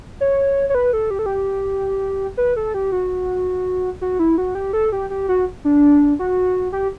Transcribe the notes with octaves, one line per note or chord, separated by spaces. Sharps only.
C#5
C#5
B4
A4
G4
A4
G4
B4
A4
G4
F#4
F#4
E4
F#4
G4
A4
G4
G4
F#4
D4
F#4
G4